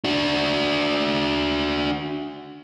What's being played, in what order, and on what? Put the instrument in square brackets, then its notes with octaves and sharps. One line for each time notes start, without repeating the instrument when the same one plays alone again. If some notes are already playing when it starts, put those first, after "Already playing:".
[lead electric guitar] D4 F#4